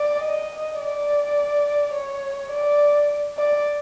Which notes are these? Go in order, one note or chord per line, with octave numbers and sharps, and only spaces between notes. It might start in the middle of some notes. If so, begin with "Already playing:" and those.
Already playing: D5
D#5
D5
C#5
D5
D5